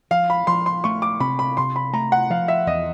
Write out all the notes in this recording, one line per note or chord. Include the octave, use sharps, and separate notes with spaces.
F3 F5
B5
F3 C6
C6
A3 C#6
D6
C3 B5
B5
C3 C6
B5
A3 A#5
F#5
F3 F5
E5
E2 D#5